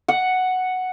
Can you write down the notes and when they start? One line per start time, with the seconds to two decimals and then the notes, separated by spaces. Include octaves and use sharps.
0.08 F#5